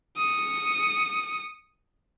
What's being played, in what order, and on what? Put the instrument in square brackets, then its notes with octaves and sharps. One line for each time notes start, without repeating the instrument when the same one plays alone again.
[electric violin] D#6 C#7